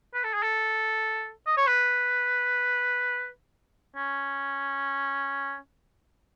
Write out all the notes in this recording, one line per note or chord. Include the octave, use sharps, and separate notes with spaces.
B4
A4
G#4
A4
D#5
C#5
B4
C#4